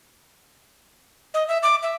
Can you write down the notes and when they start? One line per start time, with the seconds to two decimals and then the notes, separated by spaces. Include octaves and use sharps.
1.34 D#5
1.48 E5
1.63 D6
1.83 E5